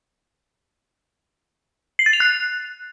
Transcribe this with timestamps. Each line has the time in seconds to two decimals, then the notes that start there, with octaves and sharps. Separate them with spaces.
1.99 C7
2.06 A6
2.13 F7
2.20 F#6